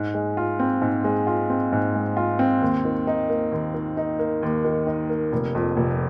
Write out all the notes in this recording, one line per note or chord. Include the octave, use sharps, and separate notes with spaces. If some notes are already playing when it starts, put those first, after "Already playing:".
Already playing: G#2
G#3
F4
C4
G#2
G#3
F4
C4
G#2
G#3
F4
C4
D#2
D#3
D#4
A#3
D#2
D#3
D#4
A#3
D#2
D#3
D#4
A#3
F1
F2
F1